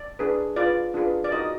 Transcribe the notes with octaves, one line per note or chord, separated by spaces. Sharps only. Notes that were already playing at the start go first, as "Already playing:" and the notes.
Already playing: D5
D4 G#4 B4
F4 G#4 B4 D5
D4 F4 G#4 B4
D5
D#4 F#4 A#4 D#5